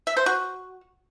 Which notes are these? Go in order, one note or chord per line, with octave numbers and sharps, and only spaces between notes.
E5
C5
F#4